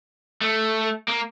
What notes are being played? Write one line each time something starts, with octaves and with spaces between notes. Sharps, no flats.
A3
A#3